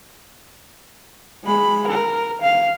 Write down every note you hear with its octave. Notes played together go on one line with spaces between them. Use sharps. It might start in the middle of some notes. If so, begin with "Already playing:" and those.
G#3 B5
A#4
F5